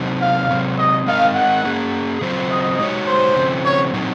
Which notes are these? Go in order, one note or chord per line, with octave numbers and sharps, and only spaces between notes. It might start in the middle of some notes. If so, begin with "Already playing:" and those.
Already playing: C3 F#3 C4 D#4
F5
C3 F#3 C4
D#5
G#3 C4 D#4 A#4 D#5 F5
F#5
A#3 C#4 G#4
C#3 F#3 C4 F4 C5
D#5
G#3 D#4 F#4 C#5
C5
C#3 F3 C4
C#5
A#2 F#3 C4 D#4